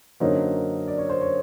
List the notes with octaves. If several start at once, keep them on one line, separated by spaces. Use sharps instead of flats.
F#2 D3 F#3 A#3 D#4 C5
D5
C#5
C5
C#5